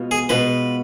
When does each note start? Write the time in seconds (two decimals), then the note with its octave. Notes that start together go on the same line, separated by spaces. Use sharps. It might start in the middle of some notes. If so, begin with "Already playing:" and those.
Already playing: B2 G#3 B3 F4
0.11 G#4
0.29 B2 G#3 B3 F4 B4